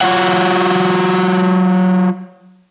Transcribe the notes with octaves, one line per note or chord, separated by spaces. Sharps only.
F#3 F4 F#4 C#5 F#5